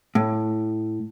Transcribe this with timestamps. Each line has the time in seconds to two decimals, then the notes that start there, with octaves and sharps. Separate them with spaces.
0.15 A2